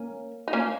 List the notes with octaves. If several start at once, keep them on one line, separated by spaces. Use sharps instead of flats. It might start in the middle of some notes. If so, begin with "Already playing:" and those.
Already playing: A#3 C#4
D#4
A#3 C#4